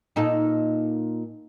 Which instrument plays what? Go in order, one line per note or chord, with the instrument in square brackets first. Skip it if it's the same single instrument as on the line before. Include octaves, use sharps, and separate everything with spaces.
[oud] A#2 D#4 A4